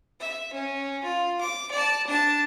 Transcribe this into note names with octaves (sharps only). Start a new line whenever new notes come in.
E5
C#4
F4
D6
D5 A5
D4 A5